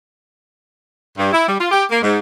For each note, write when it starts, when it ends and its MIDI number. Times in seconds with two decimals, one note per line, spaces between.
1.17 1.29 43
1.33 1.46 64
1.47 1.58 55
1.59 1.70 65
1.71 1.84 67
1.90 1.99 58
2.02 2.18 44